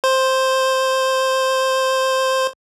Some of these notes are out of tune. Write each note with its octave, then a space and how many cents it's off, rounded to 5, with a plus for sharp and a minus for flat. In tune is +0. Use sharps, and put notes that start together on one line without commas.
C5 +5